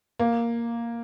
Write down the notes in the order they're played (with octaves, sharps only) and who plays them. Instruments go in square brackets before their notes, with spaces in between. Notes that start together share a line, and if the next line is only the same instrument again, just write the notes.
[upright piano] A#3